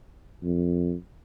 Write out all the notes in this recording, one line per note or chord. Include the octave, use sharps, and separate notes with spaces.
F2